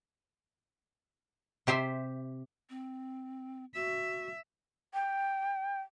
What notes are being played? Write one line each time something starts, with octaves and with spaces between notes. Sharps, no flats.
C3 G4 C5 E5
C4
F#4 E5
G5